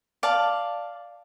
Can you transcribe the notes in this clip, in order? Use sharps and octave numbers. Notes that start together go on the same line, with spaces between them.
D5 F5 A5